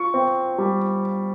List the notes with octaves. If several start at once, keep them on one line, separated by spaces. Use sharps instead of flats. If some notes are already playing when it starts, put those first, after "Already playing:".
Already playing: F4 C#6
C4
G3